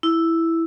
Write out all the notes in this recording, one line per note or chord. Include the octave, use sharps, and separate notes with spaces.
E4